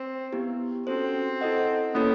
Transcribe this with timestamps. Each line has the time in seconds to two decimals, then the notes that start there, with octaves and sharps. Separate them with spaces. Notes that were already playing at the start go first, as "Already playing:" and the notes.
Already playing: C4
0.32 B3 E4 G4
0.87 C4 C#4 F#4 A4 C5
1.41 E4 A4 C5 D#5 F#5
1.94 A#3 B3 C#4 E4 A4 C#5